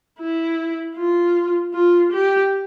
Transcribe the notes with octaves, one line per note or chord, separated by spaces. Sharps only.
E4
F4
F4
G4